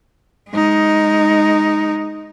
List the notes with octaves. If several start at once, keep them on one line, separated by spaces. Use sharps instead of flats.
G#3 D#4